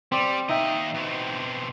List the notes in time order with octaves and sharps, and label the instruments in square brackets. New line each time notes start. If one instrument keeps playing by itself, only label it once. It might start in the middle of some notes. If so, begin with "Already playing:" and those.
[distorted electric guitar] G3 [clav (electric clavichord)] C4 D5
[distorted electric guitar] D#2 D#5 [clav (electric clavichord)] D#4 E5 G5
[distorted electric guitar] B2 C4